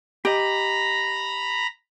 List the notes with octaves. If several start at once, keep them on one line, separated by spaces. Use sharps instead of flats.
G4 D#5 A#5 B5